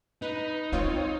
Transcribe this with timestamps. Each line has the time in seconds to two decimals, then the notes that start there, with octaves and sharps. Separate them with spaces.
0.22 D#4 B4
0.72 C4 C#4 F4 C#5